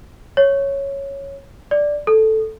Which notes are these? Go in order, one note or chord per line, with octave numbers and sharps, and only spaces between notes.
C#5
D5
A4